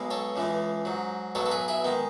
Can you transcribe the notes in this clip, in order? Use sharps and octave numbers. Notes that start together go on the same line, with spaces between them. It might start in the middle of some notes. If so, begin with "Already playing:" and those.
Already playing: B1 B2 G#3
A4 C#5
C#2 C#3 E3 G#3
G#2 F#3
B1 B2 F#3 A4 C#5
A4
G#4 B4
E4 G#4
D#3 G#3 B3